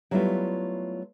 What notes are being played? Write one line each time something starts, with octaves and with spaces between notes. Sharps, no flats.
F#3 G3 A3 B3 E4 F4